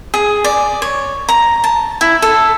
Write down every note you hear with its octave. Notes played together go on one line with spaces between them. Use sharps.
G#4
D5
C#5
A#5
A5
E4
A4